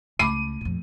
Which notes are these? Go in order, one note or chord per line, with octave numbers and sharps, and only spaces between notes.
C#2 A3 B5 D6 D#7
F2 A#2